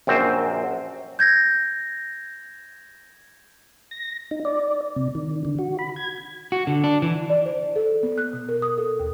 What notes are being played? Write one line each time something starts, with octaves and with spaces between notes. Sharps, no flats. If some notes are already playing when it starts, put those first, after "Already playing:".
A#1 F#2 C4 C5
G6 G#6 A#6
A#6
D#4
D5
C3
D#3
D3
F#4
B5
G#6
F#4
D3
D4
E3
D5
C5
A4
B3
F#6
B2
A#4
D#6
A4
D#2